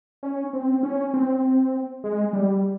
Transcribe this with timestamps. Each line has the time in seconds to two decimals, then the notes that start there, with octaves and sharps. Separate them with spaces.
0.23 C#4
0.53 C4
0.83 C#4
1.14 C4
2.04 G#3
2.33 G3